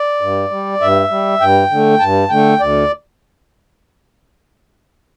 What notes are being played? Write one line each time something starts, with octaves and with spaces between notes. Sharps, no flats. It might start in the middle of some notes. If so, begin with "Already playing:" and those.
Already playing: D5
G2
G3
G2 E5
G3
G2 G5
D3 A3
G2 A5
D3 A3 G5
D2 D5